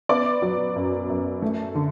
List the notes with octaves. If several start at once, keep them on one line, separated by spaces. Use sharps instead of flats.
B3 D5 D6
F#3
F#2
F#2
A3
D3